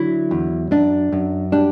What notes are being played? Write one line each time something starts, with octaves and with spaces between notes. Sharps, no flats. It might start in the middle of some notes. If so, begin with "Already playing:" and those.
Already playing: D3 F#3 E4
E2
F#2 D4
F#2
G3 D4